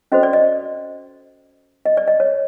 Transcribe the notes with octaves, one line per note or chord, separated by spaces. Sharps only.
C#4 F#4 A4 C5 D#5
D5
D#5
D#5
D5
D#5
C#5